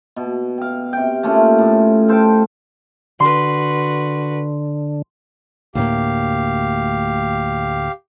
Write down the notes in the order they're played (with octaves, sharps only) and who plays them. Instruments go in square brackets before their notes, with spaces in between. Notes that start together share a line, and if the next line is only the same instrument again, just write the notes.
[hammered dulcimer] B2
F5 G5
C3 G5
A3 A#3 C#4 F4
A2
A4 C5 F5 G5
[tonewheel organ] D3 [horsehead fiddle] F#4 B4 [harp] C6
[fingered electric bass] D2 A2 A#3 [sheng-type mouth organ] G4 F5